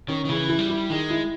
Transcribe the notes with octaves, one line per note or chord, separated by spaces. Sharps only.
D#3 C#4
D#3
C#3 E3
E4
G3
E4
D#3 G#3
E4